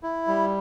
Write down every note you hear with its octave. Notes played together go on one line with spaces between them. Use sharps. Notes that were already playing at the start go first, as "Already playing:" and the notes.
E4
G3